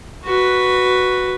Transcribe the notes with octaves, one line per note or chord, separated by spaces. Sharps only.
F#4 B4